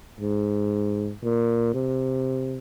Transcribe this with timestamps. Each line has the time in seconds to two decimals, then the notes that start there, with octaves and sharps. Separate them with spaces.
0.21 G#2
1.23 A#2
1.74 C3